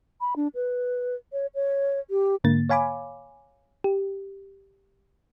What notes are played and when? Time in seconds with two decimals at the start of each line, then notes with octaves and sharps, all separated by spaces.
0.21 B5
0.36 D4
0.55 B4
1.33 C#5
1.55 C#5
2.10 G4
2.44 G#2 D3 A#3 A6
2.69 C#5 F5 G#5 B5 D6
3.84 G4